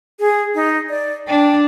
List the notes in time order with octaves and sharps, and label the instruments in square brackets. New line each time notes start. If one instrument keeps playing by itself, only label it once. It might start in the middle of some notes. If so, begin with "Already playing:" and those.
[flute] G#4
D#4
D5
[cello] D4 [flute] G5